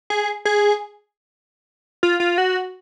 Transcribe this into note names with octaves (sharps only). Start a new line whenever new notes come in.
G#4
G#4
F4
F4
F#4